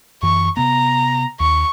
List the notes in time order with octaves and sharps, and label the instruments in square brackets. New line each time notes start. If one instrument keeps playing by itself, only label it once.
[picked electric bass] F#2 E3 [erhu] C#6
[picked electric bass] C3 B3 [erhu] A#5
[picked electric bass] D#2 [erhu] C#6